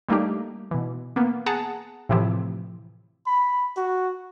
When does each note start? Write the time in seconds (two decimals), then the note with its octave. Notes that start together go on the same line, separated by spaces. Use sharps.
0.09 G3 A3 A#3 D4 D#4 G4
0.71 B2 E3
1.16 A#3 B3
1.46 G#4 F#5 A5 A#5
2.09 A2 C3 E3 F3 E4 G4
3.27 B5
3.77 F#4